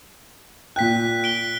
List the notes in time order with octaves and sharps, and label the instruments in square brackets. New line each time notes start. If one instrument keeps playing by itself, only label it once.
[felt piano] A#2 G5 [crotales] F#6 B6
[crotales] D7 G7